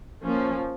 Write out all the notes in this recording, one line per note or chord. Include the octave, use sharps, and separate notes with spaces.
F3 A#3 C#4